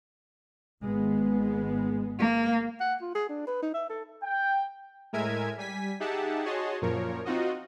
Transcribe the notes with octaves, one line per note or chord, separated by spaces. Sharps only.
G#1 G#3 B3
A#3
F#5
F4
G#4
D4
B4
D#4
E5
A4
G5
A2 G#3 A#4 E5 G#5 G#6
G3 G#5 B6
D#4 G4 G#4 E5 F#5 A5
F#4 G#4 C#5 D#5 A5 C6
F#2 A#2 F3 A#4 C#5
C4 D#4 F4 F#4 D#5